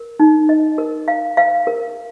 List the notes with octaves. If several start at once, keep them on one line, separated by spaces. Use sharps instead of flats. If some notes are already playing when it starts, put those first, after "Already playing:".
Already playing: A#4
D#4
D#5
A#4
F5
F5
A#4